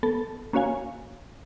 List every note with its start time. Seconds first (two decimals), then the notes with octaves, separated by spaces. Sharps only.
0.03 B3 A4 A5
0.53 A#3 C#4 F#4 C#5 F5 G#5